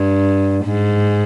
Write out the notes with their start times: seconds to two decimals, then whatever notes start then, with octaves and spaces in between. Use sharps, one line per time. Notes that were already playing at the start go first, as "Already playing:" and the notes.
Already playing: G2
0.65 G#2